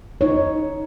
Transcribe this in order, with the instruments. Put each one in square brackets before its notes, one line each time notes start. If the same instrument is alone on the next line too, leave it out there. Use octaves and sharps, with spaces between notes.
[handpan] D#4 C#5